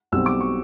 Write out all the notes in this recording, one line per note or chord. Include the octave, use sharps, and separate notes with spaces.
B1 B2 G3 C4 E6
D6
C#6